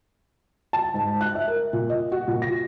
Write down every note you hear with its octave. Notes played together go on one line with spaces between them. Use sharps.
A5
G#2
F#6
E5
A#4
A#2
D#5
F#4
A#2
A#6